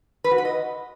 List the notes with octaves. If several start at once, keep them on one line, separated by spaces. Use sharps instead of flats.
B4
F#4
B4
D#5